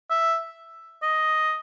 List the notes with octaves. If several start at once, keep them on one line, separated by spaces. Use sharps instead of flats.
E5
D#5